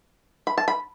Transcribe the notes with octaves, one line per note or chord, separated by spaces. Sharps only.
B5
A5
B5